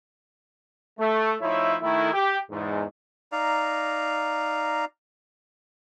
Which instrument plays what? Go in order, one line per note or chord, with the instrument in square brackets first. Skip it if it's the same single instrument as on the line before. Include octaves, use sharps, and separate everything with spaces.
[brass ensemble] A3
A2 F3 D#4 E4 C#5 E5
D#3 A3 E4
G4
E2 G#2
[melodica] D#4 D5 F5 A#5